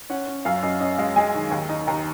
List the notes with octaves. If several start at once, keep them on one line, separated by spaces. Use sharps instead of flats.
C#4 F#5
C#4
F#2 F5
F#2 D#5
C#4 D#5
G#3 F5
G#3 G#5
D#3
D#2
D#4
D#2 A#5